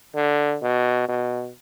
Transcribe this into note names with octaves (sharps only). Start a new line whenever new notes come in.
D3
B2
B2